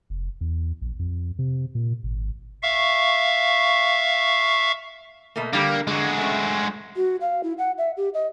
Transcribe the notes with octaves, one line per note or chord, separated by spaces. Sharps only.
F1
E2
A#1
F2
C3
A#2
G#1
E5 F5 C#6
B2 A3 A#3
D3 G3 A#3 D4
D3 G#3 F#4
A3 C#4
F#4
F5
E4
F#5
E5
G4
D#5